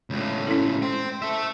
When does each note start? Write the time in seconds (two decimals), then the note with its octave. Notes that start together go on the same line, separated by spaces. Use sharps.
0.10 C#2 A2
0.47 C#4 E4 A4
0.82 C5 G5
1.22 A4 E5